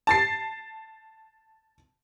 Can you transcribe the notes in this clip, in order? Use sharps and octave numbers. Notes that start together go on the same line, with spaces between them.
A5 A6 C7